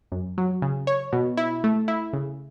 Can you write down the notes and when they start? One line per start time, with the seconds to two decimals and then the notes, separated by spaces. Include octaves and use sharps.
0.12 F#2
0.38 F#3
0.62 C#3
0.87 C#5
1.13 B2
1.37 E4
1.64 A3
1.88 E4
2.13 C#3